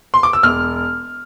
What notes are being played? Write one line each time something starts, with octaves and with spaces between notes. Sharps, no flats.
C6
D6
E6
E1 F6